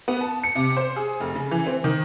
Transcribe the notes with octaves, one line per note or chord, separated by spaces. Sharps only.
B3
A5
C#7
C3
C5
G#4
F1
C#3
E3
C4
D#3